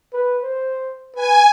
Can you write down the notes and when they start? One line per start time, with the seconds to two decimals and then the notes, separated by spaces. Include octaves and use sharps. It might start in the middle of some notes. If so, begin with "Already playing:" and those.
0.13 B4
0.43 C5
1.15 B4 G#5